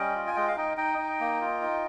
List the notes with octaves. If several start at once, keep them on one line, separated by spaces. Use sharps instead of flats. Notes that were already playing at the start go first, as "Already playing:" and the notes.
Already playing: G3 C#4 D#5 G5
F4
G#5
G#3 D#5 G5
F5
D#4 D#5 G5
D#4 D#5 G5
D#4
A#3
F4
D#4